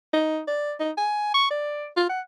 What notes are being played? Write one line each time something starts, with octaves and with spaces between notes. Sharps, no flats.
D#4
D5
D#4
G#5
C#6
D5
F4
F#5